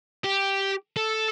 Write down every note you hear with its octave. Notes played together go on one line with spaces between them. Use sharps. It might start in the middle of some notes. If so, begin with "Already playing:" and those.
G4
A4